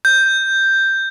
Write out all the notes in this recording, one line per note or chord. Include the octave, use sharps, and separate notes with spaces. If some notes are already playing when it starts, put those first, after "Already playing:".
G6